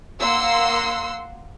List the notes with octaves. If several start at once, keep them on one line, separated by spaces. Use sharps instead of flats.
A#3 F#5 C6 E6